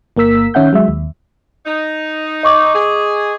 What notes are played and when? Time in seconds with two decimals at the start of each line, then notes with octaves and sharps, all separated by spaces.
0.17 G1 A#3 A#4 E6 B6
0.54 D#3 C#4 E5 F#5 G6
0.73 F#3 G#3 E5
0.88 D#2
1.65 D#4
2.43 D#5 C#6 D6
2.74 G#4